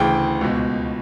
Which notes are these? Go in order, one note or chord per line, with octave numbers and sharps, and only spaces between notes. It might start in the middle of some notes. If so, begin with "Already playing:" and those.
Already playing: D2 C#3 E3 G5
C#2 B2